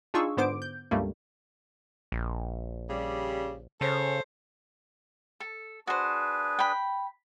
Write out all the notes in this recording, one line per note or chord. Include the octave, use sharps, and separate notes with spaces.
D4 D#4 F4 G#4 C#6 E6
G#2 D3 B3 C5 D6 D7
G6
C#2 G2 G3 A3 A#3
A#1
C#3 G3
C#3 A4 C5 C#5
A4
D4 F#4 G#4 B4 C5
G5 B5